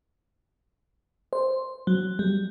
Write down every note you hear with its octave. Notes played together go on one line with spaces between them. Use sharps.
C5
F#3
G3